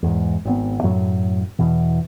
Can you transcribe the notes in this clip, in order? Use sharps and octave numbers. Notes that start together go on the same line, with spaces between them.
E2 G#2
G#1 B3
F#2 A2 F#3
E2 B2 E3